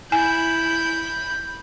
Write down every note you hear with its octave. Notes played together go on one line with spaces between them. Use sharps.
E4 G#5 B5 G6